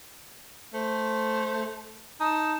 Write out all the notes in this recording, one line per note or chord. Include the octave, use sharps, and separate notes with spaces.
A3 C5
D#4 A5